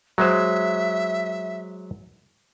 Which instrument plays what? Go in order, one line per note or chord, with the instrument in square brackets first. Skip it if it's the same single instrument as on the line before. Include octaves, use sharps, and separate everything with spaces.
[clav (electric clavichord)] F#3 G#3 C5 [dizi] E5